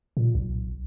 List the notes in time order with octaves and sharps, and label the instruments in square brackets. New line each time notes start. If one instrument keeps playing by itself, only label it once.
[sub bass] A#2
B1